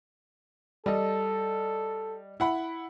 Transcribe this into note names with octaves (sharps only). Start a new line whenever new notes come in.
G3 A4 D#5
E4 F#5 B5